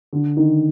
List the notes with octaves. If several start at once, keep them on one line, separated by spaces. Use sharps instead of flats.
D3
D#3